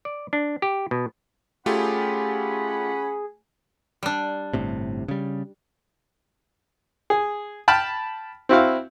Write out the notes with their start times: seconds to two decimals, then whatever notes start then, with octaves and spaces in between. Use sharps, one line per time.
0.05 D5
0.33 D4
0.62 G4
0.91 B2
1.66 A3 C#4 F4 G4 G#4 F#5 B5
4.03 G3 D4
4.54 G1 A2 C3
5.08 C#3 G3
7.10 G#4
7.68 G5 A5 B5 F6
8.49 C4 E4 F#4 F5